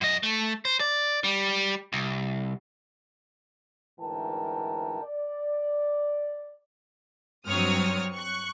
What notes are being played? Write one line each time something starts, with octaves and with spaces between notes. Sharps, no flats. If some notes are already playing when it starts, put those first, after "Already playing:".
F#2 D#5
A3
C5
D5
G3
C2
D2 G#2 E3 A#4 G5 A5
D5
G2 F#3 C4 C#5 D#6 F6
C#6 F#6